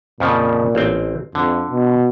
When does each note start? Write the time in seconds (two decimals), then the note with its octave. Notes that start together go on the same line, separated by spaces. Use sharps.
0.20 F2 A#2 C#3 F3
0.75 A1 C4
1.35 F2 D3
1.71 B2